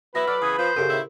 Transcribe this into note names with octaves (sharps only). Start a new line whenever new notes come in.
F#3 B3 E4 B4 A#6
F#3 A4 D5 F6
C#3 E3 B3 G#4 D#6
F3 C5
F#2 C#3 G4 A4 A#4
A2 D#3 E4